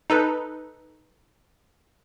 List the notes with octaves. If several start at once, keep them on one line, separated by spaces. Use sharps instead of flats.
D#4 A4 B4